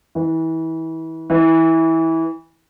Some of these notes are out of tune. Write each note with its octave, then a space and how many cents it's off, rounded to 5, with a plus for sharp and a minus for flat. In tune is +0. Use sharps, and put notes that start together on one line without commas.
E3 -30
E3 -20